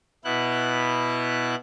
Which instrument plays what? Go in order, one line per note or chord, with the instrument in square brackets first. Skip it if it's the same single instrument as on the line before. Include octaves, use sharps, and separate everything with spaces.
[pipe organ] B2 B3 E4 F#6